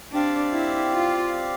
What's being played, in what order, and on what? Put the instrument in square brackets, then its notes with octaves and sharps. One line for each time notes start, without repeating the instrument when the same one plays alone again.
[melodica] C4 G4 D5 F5 [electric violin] D4
[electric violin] E4
F4